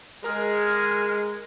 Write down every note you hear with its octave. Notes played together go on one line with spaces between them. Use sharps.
G#3 G#4 A#4 F6